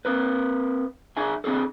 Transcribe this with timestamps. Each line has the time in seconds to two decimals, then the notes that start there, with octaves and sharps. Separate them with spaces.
0.05 C4 A#4 B4
1.17 D4 G#4 E5 G#5
1.44 C4 D4 G#4 A4